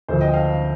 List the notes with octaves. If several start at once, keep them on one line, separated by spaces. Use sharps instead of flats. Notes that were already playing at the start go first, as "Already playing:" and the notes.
D2 D3 F3 A4 C5
D#5 G5
F5 A5